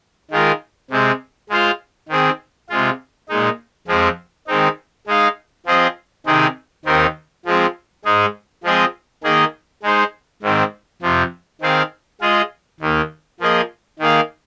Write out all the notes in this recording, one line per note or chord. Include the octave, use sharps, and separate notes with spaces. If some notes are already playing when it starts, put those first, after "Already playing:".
D#3 G#3 F4 A#4
C3 G#3 C4
G#3 F4 C5 F5
D#3 C4 G#4
C3 G#3 F4
A#2 G#3 D#4
F2 F3 G#3 C4
D#3 G#3 C4 D#4
G#3 D#4 G#4 F5
F3 C4 G#4 C5 D#5
C3 D#3 C4 D#4 G#4
D#2 D#3 C4 D#4 A#4
F3 G#3 C4
G#2 G#3 D#4 G#4
F3 G#3 C4 G#4 D#5
D#3 A#3 G#4 D#5
G#3 D#4 C5
G#2 D#3 C4
F2 C3 F3
D#3 C4 G#4 F5
G#3 F4 G#4 D#5
D#2 D#3 A#3
F3 A#3 G#4 D#5
D#3 A#3 G#4 F5